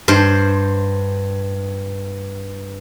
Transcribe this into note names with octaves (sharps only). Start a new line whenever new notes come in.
G2 C5